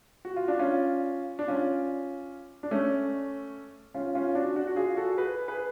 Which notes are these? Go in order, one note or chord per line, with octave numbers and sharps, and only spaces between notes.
F#4
F4
D4
C#4 F4
D4
C#4 F4
D4
A3 C#4
C#4 F4
C#4 F4
D4 F#4
D4 F#4
F#4
F4 G#4
F#4 A4
G#4 B4
G#4 B4